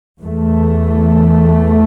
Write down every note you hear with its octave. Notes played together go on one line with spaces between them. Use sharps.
E2 E3 A3